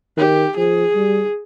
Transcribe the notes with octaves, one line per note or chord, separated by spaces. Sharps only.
D#3 G4
F3 G#4
G3